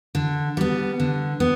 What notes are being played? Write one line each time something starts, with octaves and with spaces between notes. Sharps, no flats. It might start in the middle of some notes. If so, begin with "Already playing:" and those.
D3
G3 B3
D3
B3